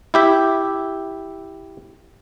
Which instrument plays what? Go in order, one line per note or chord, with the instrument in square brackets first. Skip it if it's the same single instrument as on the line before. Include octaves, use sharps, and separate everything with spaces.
[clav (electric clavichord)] E4 G4 E5